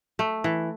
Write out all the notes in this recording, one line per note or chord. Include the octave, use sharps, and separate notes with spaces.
A3
E3